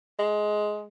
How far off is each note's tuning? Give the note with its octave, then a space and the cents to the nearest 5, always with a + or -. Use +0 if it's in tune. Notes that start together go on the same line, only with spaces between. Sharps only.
G#3 +15